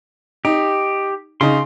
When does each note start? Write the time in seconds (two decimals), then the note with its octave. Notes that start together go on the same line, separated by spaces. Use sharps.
0.45 D#4 G4
1.41 C#3 D#4 C6